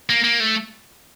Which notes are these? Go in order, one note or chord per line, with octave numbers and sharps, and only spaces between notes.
A#3
A#3
A3